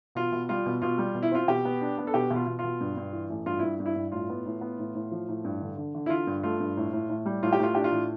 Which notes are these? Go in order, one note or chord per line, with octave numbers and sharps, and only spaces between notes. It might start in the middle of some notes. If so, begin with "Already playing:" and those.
B2 F4
B2
G3 F4
B2
B2 F4
G3
B2
E4
C4 F4
B2 G4
B3
D4
B3
A4
B2 G4
B2
F4
B2
F4
B2
G2
G2
E3
A1
G2 F4
G2 E4
G2
E4
G2
A2 F4
B3
A2
B3
A2
A2
F3
A2
G2
D3
D3
D3
E4
D3 F4
G2
A3 F4
G2
A2
A2
A2
G3
A2 F4
G4
A2 F4
D4 G4
F4
A2